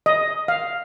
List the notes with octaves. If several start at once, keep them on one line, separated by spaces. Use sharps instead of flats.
D#5
F5